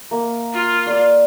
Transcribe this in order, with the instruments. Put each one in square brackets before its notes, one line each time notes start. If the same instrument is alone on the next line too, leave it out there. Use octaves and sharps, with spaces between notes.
[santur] A#3
[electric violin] F4
[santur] D5 E6